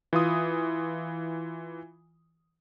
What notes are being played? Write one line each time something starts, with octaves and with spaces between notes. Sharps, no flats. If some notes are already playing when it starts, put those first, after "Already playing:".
E3 F4 D#6